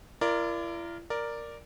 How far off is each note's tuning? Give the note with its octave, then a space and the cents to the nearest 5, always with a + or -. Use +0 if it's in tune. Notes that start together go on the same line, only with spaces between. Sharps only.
E4 +45 A#4 +0 D5 +0
A#4 +0 D5 +0